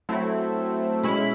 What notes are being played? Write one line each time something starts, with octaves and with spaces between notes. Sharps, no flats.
F#3 A3 C4 E4
B2 G#3 C#4 E4 B5